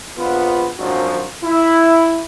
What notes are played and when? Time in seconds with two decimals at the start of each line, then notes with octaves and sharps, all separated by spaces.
0.17 A#1 B3 F4
0.79 G#1 F#2 F3 F#3 D4 F#4
1.44 E4